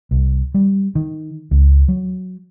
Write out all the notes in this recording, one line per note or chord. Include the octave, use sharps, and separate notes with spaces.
C2
G3
D#3
C#2
F#3